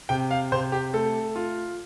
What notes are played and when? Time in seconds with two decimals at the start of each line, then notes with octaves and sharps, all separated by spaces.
0.09 C3 G5
0.31 F5
0.52 C3 C5
0.72 G4
0.93 A3 A4
1.36 F4